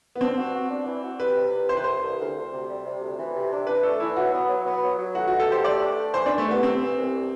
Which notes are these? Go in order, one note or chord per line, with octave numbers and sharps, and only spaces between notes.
B3
C4 D4
F#4
F#4
D4
E3
F#4
G3 B4
C3
C2
C3 C5
B4
C2 C5
C2
D2
D2
C3
G3
C3
D2
E3
C3
D4
D4 B4
A3 A4
E3 E4
F#3 F#4
B3
F#3
B3
F#3
F#3
A3 F#4
B2 F#4
A4
G4 C5
A3 D5
D4
A3
E3 C5
C2 D4
A3
C2 B3
C3 C4
E3
C2